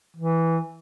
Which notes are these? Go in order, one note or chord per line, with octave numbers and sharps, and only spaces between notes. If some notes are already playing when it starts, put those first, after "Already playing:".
E3